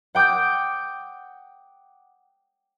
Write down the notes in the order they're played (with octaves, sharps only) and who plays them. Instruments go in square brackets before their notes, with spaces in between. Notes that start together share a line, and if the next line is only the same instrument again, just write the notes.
[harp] F#5 G5 D6 D#6 G6